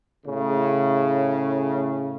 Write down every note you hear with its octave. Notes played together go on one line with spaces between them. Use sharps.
A2 C#3